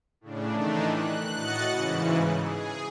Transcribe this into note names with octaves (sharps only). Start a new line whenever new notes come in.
A2 C#3 D4
D#3 E3 A3 D4 D#4
F#6
A2 F#4 D#5 F#6 A6 C#7
G#2 C#3 E3
G#4